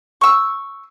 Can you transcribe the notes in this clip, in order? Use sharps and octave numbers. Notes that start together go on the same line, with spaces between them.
C#6 E6